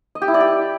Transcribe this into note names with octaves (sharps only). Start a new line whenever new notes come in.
D#5
G4
E4
D5
G4